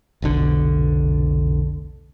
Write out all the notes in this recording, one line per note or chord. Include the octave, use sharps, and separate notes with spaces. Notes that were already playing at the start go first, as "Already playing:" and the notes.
F1 B1 D3